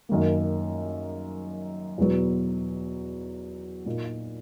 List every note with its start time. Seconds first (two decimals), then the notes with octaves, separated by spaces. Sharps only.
0.09 F#2 D#3 A#3
1.98 E2 B2 F#3 B3
3.86 A#2 A#3 D#4